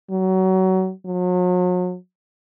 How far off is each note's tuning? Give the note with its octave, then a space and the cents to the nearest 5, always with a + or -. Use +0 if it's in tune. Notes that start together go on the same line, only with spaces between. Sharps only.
F#3 +25
F#3 -40